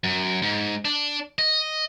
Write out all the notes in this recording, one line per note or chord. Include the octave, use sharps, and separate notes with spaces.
F#2
G#2
D4
D#5